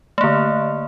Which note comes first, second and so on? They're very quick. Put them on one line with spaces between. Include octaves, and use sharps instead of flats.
A3 A#3 D3